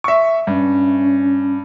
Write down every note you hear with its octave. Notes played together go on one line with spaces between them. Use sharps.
E5 C#6
G2 C#4